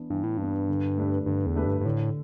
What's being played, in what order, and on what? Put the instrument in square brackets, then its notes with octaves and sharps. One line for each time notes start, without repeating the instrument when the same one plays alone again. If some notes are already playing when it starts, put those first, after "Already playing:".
Already playing: [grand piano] E3 B3 D4
[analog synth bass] G2 [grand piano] E3
[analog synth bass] A2
[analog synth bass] G2 [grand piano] B3 D4
[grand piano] D3
A3 D4 G4 B4
[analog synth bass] G2 [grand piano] D3
[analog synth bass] E2
[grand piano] A3 D4 G4 B4
[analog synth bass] G2
G2
[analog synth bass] A2 [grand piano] D3